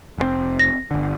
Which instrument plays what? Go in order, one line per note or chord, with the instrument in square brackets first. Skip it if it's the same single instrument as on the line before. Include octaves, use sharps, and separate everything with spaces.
[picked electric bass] F1 A#2 C4
[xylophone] A#6
[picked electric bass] G1 D3